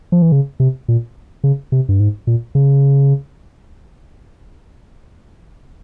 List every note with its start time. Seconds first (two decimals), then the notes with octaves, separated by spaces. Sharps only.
0.12 F3
0.22 E3
0.32 C#3
0.60 C3
0.88 A#2
1.44 C#3
1.72 C3
1.89 G2
2.00 G#2
2.27 A#2
2.55 C#3